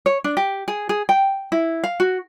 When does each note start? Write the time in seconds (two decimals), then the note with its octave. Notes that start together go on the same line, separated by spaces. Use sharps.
0.06 C#5
0.24 D4
0.37 G4
0.68 G#4
0.89 G#4
1.09 G5
1.52 E4
1.84 F5
2.00 F#4